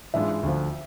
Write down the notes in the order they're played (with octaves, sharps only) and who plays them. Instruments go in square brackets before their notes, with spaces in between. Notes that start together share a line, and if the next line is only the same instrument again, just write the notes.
[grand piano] G#2 E3 G#3 D4 F4 [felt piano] E5
[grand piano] D2 D3 F3